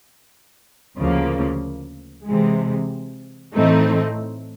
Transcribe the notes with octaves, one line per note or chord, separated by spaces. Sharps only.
D2 C#3 F3 A#3
C3 E3 G#3
A2 E3 A3 C4 D#4